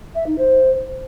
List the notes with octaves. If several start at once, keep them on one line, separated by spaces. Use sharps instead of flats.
E5
D#4
C5